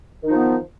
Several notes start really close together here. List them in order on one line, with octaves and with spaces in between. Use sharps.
D#3 D#4 F3 B3